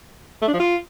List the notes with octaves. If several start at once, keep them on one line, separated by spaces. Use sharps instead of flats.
A3
D4
F3
F4